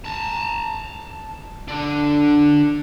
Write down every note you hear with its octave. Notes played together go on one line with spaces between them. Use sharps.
A5 A#5
D3 D4